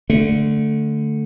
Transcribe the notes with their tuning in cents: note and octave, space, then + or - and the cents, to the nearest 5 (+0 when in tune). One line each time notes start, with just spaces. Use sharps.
D3 +0 A3 +0